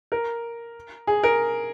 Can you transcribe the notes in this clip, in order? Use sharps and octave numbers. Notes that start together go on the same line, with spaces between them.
A#4
G#4
A#4